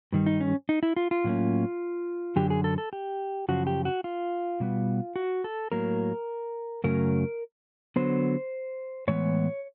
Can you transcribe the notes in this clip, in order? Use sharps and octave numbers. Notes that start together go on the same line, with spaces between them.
G2 D#3 G3
D#4
C#4
D#4
E4
F4
F4
A2 F#3 A#3 C#4
F#2 D3 F#3 G4
G#4
A4
A4
G4
F#2 C#3 F3 F#4
G4
F#4
F4
B2 G3 B3
F#4
A4
A2 F#3 A#3 A#4
F#2 C#3 F#3 A3 C#4 A#4
D3 F#3 B3 C5
A2 E3 G#3 B3 C#5